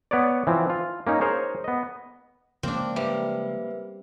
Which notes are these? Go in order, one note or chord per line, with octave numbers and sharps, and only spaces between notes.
B3 B4 C#5 D5
E3 F3 C4
F4
A#3 C#4 D#4
G#4 A#4 C5 C#5
B3 D#5
C#3 F3 G#3 A#3 C4 D4
G3 B4 E5